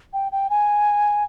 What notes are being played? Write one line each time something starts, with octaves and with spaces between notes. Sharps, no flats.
G5
G5
G#5